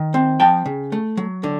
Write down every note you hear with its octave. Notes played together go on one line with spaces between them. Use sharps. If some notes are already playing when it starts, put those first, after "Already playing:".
Already playing: D#3
C4
F3 G5 A5
C#3
A3
F#3
D3